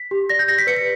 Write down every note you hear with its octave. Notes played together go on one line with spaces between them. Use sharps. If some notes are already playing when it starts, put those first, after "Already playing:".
Already playing: B6
G4
D5 A#6
G6
G4 A#6
B6
B4 C#7
B6